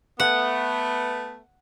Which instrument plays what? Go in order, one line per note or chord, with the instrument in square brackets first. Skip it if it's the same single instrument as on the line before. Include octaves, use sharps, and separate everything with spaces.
[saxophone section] A3 B3 [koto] F#5